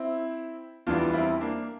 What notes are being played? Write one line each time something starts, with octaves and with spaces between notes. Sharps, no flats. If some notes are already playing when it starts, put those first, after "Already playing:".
Already playing: C4 E4
E2 E3 G3 D4 F4
C4 E4
A#3 D4